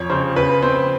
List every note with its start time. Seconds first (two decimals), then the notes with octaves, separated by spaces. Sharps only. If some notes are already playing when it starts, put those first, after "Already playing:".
Already playing: F2 C#5
0.10 C#3 C5
0.36 C#3 B4
0.62 C4 C5